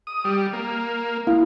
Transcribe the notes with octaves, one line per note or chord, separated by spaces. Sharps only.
D#6
G3
A#3
A#3 E4 F5